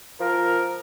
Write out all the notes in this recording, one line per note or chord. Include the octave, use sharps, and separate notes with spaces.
F3 A#4